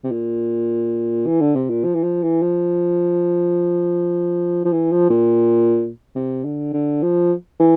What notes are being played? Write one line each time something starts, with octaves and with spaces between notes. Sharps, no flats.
C3
A#2
E3
D3
C3
A#2
F3
E3
F3
E3
F3
F3
E3
F3
A#2
C3
D3
D3
F3
E3